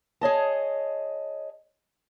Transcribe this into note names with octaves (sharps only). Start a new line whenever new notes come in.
G#4 C#5 D#5 A5